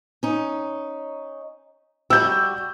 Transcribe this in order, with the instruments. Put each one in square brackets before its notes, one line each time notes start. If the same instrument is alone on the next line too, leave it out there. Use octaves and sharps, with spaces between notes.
[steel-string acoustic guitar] C#4 D#4
[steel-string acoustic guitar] G3 F#4 [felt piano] E6 G6